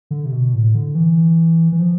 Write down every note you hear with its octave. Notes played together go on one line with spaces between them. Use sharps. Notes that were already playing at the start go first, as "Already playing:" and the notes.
D3
C3
B2
A2
D3
E3
E3
F3